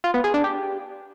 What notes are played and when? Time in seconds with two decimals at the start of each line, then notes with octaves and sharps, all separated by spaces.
0.04 F4
0.14 B3
0.24 G#4
0.34 D4
0.44 G4